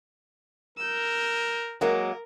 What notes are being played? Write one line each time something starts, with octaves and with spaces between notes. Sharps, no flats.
A#4 E6 G6
F#3 G#3 A#3 A#4